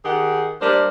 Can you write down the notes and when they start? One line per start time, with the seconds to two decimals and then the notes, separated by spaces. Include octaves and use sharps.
0.04 D#3 G4 G#4 F#5
0.61 G3 A#3 D4 A#4 C5